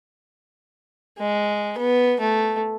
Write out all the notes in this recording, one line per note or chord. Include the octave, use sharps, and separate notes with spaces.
G#3
B3
A3